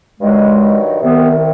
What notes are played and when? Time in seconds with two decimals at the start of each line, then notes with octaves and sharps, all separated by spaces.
0.21 G2 D#3 F#3 G#3
1.01 C2 C3 D#3 B3